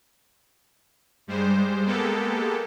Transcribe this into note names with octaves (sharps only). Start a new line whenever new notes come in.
G2 G3 G#3 C5
G#3 A#3 B3 G4 A4